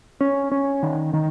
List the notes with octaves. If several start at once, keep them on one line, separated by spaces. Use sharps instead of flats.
C#4
C#4
D#3
D#3